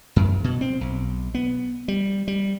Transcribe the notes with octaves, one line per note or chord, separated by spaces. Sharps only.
F#2
B2
C4
B1
B3
G3
G3